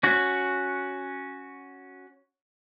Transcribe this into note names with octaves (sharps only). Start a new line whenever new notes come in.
C#4 F#4